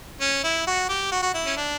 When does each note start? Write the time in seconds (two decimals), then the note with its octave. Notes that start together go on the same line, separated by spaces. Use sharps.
0.21 C#4
0.44 E4
0.67 F#4
0.89 G4
1.12 F#4
1.23 F#4
1.34 E4
1.46 C#4
1.57 D4